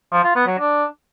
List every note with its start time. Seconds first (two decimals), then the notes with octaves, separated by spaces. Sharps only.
0.12 F3
0.24 F4
0.35 B3
0.47 F#3
0.59 D4